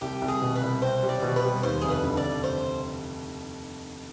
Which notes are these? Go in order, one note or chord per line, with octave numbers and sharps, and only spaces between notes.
C2 G4
C2
G#4
B2
B4
C2
C4 C5
G3
D5
B2
B4
G3
D#2 C5
F1 G#4
B4
D3
D5
F1
C5